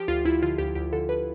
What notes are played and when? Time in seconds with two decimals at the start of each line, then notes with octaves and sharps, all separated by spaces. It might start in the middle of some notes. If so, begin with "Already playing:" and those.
Already playing: F3 G4
0.08 D2 F4
0.25 D2 E4
0.42 D3 F4
0.58 D2 G4
0.75 D2 G4
0.93 D3 A4
1.09 D3 B4